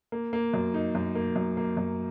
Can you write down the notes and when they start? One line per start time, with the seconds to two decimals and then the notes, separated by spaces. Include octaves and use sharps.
0.12 A#3
0.33 A#3
0.54 F#2
0.74 D#4
0.95 F#2
1.15 A#3
1.36 F#2
1.57 A#3
1.77 F#2